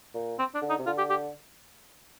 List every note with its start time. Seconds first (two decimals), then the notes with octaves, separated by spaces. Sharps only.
0.14 A#2
0.39 C4
0.55 D4
0.62 D3
0.70 D#4
0.79 C3
0.86 D3 F4
0.98 G4
1.10 G4